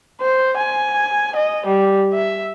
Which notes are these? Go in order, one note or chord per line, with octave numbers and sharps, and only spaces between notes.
C5
G#5
D#5
G3
E5